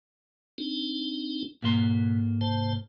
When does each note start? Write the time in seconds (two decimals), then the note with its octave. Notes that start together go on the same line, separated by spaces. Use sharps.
0.58 C4 D4 D#4
1.63 G#2 B2 A#3 C6
2.41 C3 C5 A5